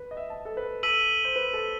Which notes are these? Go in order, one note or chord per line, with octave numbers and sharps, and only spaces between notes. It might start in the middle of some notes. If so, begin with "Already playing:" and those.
Already playing: B4
D#5
E5
A5
A4
B4
A4 E6 B6 D#7 F#7
C5
B4
A4